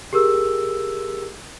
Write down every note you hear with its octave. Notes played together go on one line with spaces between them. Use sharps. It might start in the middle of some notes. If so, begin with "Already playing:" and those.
G4 G#4 A#4 E6